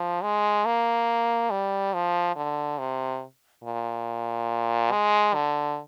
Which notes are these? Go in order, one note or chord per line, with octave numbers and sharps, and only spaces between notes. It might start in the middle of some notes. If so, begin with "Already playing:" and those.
Already playing: F3
G#3
A#3
G3
F3
D3
C3
A#2
G#3
D3